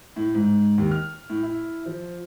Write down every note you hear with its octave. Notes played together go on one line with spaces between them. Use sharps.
A2
G#2
D#2
F6
A2
E4
F3